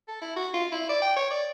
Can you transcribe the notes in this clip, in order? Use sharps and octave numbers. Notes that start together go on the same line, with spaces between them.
A4
E4
F#4
F4
E4
D5
G5
C#5
D5